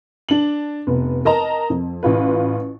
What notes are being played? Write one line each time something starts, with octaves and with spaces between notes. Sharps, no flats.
D4 F#7
F1 B3
A#4 D#5 A5 A#5
F2
A1 F4 B4